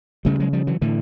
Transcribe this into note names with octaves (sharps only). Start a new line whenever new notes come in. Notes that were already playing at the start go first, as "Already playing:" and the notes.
D2 C#3 G3 A3
F#3 G#3
F3 G3
E3 F#3
A2 D3 E3